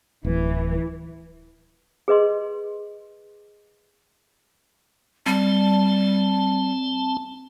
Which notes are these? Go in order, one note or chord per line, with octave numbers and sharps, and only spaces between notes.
D1 E3
G#4 B4 D#5 C6
G3 C4 A5